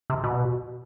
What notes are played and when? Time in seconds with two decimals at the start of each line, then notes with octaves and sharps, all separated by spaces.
0.10 C3
0.24 B2